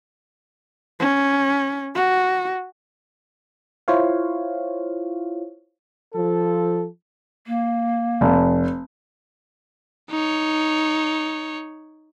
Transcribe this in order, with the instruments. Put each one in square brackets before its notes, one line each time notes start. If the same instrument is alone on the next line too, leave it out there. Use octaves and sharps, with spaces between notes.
[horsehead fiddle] C#4
F#4
[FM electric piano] E4 F4 C5 C#5 F5
[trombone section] F3 A4
[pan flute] A#3
[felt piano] F1
[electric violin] D#4 C#5